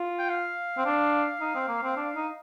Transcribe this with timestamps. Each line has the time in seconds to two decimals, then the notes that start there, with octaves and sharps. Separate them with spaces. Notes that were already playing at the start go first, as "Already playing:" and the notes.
Already playing: F4
0.19 G5
0.30 F5
0.78 C4
0.86 D4
1.41 D#4
1.55 C4
1.68 A#3
1.83 C4
1.97 D4
2.15 D#4